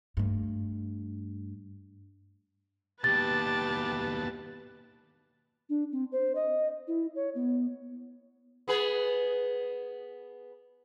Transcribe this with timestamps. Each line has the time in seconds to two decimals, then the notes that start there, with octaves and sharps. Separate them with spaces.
0.17 G2 A3
3.04 D#2 B2 G4 B4 A5 A6
5.69 D4
5.92 C4
6.12 C5
6.35 D#5
6.88 E4
7.16 C#5
7.35 B3
8.68 B3 G#4 B4